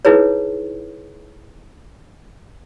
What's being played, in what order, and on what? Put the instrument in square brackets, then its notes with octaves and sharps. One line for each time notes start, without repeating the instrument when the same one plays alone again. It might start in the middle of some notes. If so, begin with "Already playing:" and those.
[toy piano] D#4 E4 G#4 B4 C#5